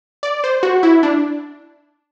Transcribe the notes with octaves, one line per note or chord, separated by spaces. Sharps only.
D5
C5
F#4
E4
D4